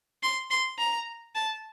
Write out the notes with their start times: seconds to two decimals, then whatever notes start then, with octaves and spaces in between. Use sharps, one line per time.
0.23 C6
0.51 C6
0.79 A#5
1.35 A5